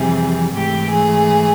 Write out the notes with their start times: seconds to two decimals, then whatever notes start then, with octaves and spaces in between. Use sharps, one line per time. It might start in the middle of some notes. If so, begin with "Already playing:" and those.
Already playing: F2 C3 E3 G3 G#4
0.55 G#2 E3 A3 G4
0.91 G#4